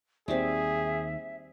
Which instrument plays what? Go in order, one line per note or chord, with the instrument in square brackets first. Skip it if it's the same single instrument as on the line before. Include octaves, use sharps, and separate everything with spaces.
[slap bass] D#2 D#3 [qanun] G3 C4 [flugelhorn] G#4 [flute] E5